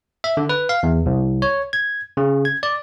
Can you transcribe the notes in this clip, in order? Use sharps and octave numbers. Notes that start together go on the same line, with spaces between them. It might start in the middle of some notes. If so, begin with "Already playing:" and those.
E5
D3
B4
F5
E2
C2
C#5
G#6
C#3
G#6
D5